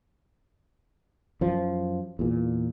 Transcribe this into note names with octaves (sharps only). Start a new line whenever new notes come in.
F#2 F3
E2 A#2